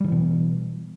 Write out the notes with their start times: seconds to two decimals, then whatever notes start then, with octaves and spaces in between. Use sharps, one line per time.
0.01 G3
0.04 D#3
0.08 E3
0.12 B2